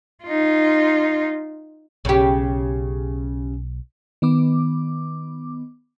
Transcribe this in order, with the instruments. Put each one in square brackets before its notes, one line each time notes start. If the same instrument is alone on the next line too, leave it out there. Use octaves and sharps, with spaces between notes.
[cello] D#4 F4
[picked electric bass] B1 [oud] C#3 G4
[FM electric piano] D#3 B3 D6